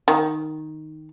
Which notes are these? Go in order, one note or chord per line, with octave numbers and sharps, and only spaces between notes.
D#3